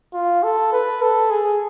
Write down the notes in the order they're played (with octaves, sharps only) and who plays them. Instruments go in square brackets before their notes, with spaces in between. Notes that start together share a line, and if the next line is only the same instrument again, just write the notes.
[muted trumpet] F4
A4
B4
A4
G#4